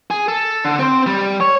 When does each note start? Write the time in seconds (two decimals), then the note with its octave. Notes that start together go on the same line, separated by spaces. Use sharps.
0.10 G#4
0.28 A4
0.64 D3
0.79 C4 C5
1.07 G3
1.40 C#5